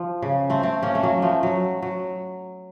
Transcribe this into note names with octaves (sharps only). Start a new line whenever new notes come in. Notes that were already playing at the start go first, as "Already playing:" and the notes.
Already playing: F3
C#3
A3 C4
A3 C4
A#3 C#4
A3
F#3 A#3
F3 A3
F#3
F#3